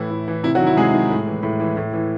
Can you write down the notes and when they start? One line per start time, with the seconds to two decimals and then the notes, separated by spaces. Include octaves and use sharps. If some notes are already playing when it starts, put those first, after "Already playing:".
Already playing: A2 E3 E4
0.10 A2
0.28 E3
0.43 C3 E4
0.55 F#3 F#4
0.61 D#3
0.67 E4
0.76 C3 G#3 G#4
0.94 D#3
1.10 A2
1.27 E3
1.43 A2
1.60 E3
1.77 A2
1.93 E3